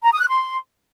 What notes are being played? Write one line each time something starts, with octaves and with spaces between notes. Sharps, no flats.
A#5
D#6
F#6
C6